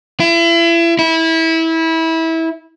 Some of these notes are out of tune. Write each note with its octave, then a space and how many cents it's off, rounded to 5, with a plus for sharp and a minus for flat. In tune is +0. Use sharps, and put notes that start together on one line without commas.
E4 +35
E4 -20